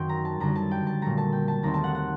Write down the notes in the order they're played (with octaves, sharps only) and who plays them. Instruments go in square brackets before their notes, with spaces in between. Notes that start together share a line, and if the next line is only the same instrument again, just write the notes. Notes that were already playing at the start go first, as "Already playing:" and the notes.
Already playing: [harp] F#2 D#3 F#3 C4 G5
A#5
A5
F#2 D3 G3 A#5
A5
G5
A5
A#2 F#3 A3 A#5
A5
G5
A5
D#2 D#3 A3 C4 A#5
A5
F#5
F#5